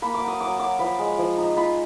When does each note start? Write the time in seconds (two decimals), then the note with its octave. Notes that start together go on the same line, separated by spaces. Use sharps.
0.02 A#3 B5
0.14 D6
0.21 F#3
0.27 D#6
0.41 F#3 D6
0.59 F#3 D6
0.79 F3 B5
0.99 G#3
1.18 F3
1.37 D#4
1.57 F4 B5